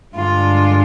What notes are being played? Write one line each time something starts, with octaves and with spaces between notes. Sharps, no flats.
G2 D3 G#3 D4 F4